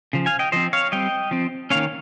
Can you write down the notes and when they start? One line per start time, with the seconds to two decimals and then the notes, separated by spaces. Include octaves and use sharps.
0.13 C#3 F3
0.26 F5 G#5
0.39 D#5 G5
0.52 F3 C4 C5 D#5
0.73 C#5 F5
0.92 G3 C4 D#5 G5
1.31 F3 C4
1.70 D#3 A#3 C#4 C#5 F5